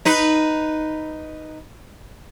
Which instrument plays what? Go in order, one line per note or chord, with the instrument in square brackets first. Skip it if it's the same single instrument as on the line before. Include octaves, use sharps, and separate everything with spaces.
[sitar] D#4 B4